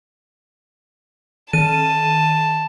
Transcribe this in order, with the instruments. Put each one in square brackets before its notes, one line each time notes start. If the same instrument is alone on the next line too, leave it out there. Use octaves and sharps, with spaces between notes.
[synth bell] D#3 D#7 [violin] A5